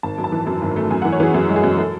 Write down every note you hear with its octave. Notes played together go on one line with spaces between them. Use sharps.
G#1 A5
F#2
A5
E3
F#2
G#1
A3
F#2 G#5
E3 F#5
C#5
E3 G#4
F#2 G#4
G#3
G#4
F#2
A4